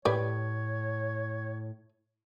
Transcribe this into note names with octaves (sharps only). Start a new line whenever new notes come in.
A2 A3 G4 B4 C#5 D5